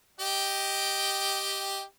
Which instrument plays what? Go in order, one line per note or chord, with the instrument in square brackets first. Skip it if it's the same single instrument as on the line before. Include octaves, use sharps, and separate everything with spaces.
[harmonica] G4 D#5 G5